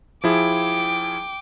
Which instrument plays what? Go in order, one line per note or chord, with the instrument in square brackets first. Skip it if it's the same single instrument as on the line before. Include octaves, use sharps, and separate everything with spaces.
[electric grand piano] F3 E4 G#4 [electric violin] G5 D6